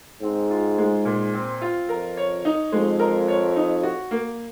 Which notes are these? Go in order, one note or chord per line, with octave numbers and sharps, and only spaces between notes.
G#2 C4
F4
G#3
A#2
C4
F4
F2 A#4
C#5
D#4
F2 G#3
A#4
C#5
D#4
F#4
A#3